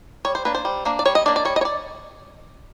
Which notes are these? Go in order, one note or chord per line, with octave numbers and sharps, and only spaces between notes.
G3 C#5
C5
A#3 D4 B4
C5
G3
A#3 D4
D5
G3 C#5
D#5
A#3 D4 D5
D5
G3 C#5
D#5
C#5
D5